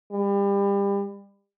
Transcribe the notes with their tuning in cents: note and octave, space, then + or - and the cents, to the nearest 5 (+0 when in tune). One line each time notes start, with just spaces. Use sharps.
G3 +30